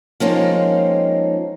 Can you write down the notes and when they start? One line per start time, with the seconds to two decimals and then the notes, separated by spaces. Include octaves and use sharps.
0.20 F3 G#3 A#3 C4 C#4 D#4